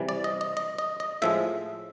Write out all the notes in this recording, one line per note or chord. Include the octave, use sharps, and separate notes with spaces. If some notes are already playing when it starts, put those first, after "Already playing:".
Already playing: C3 E3 G3
D5
D#5
D#5
D#5
D#5
D#5
A2 F3 G#3 E5